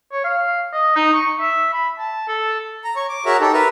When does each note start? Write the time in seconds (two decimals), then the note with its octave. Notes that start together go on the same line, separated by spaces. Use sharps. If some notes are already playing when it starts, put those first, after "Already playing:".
0.12 C#5
0.24 F5
0.73 D#5
0.96 D#4
1.13 C#6
1.40 E5
1.73 B5
1.99 A5
2.28 A4
2.84 A#5
2.96 C#5 C#6
3.09 D6
3.26 F#4 G#4 A#4 C#5 E5 A#5
3.40 D#4 G4 A4
3.53 A#4 B4 E5 A#5